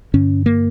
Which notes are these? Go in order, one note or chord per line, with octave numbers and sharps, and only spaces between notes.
G2 D3 C#4
A#3